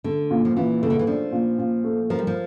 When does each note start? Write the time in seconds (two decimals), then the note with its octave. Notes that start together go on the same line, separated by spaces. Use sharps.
0.04 D3 A3
0.31 A#2
0.45 F3
0.56 A#2 E3
0.82 C#3 A3
0.90 D3
0.99 E3
1.07 F3 D4
1.32 A#2
1.59 A#2
1.84 A3
2.10 F3 A#4
2.19 G3
2.27 F3